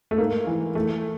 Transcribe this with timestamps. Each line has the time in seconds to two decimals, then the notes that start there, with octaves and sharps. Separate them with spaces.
0.11 A3
0.18 G#2 A#3
0.47 E3
0.75 E3 A3